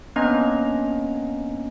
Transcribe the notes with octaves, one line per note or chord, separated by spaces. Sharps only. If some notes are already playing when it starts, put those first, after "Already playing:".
A#3 B3 C#4 D4 D#5 A#5